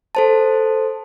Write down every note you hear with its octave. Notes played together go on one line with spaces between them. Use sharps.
A4 C5 A5